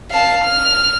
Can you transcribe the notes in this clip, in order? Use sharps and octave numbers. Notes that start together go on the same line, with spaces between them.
F5 A5
F6